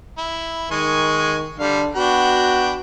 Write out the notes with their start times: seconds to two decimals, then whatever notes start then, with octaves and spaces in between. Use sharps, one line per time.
0.18 E4
0.71 D#3 G#3 G#5 C#6
1.59 D3 G3 F5
1.95 B3 D4 F#4 G5 B5